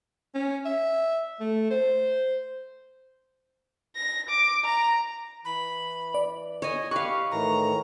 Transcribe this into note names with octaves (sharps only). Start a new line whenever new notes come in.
C#4
E5
A3
C5
A#6
D6
A#5
E3 B5
D5
C#5 D#5 G#5
G4 B4 F5 C#6
A2 D#3 E3 A#5